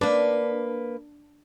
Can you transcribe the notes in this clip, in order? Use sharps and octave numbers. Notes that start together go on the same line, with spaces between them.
A#3 D4 B4